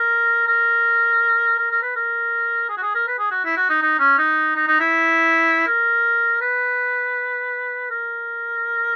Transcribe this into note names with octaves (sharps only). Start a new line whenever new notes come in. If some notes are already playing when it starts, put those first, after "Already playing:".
Already playing: A#4
A#4
A#4
A#4
B4
A#4
G#4
F#4
G#4
A#4
B4
G#4
F#4
E4
F#4
D#4
D#4
C#4
D#4
D#4
D#4
E4
A#4
B4
A#4